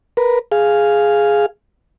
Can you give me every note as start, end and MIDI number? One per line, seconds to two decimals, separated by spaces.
0.17 0.39 70
0.17 0.39 71
0.52 1.46 68
0.52 1.46 77